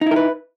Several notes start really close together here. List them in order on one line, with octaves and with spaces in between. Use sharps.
D#4 E4 A#4 B4